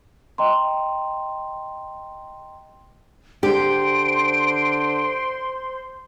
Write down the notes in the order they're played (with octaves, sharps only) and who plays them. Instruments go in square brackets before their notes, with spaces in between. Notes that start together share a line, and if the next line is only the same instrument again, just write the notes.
[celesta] D#5 G5 A#5 C6
[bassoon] D3 [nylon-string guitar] G4 [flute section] C5 C6 [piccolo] D7